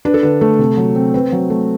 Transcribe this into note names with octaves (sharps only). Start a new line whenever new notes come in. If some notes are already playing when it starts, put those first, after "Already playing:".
D4 B4
A4
D3 B4
A3
C3
F#3
C4
C4 B4
F#3
A3